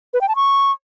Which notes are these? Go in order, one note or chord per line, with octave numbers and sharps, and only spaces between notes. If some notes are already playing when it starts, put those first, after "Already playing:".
B4
G5
A5
C#6